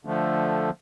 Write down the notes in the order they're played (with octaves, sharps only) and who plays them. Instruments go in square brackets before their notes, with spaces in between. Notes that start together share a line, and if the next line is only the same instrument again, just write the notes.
[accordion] D3 F3 A3